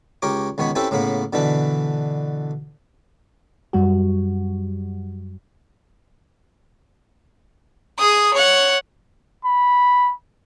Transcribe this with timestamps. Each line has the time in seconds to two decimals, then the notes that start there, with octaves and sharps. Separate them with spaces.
0.22 C#2 G4 A#4 C#5 D6
0.58 C#2 D#3 B3 C#5 B5
0.75 C4 C#4 E4 G4 A4 B4
0.91 A2 C#3 A#3 B3 B5
1.33 B2 D3 E3 D4 B4
3.73 F#2 G3 F#4
7.99 G#4 D#6
8.34 C#5 F#5
9.45 B5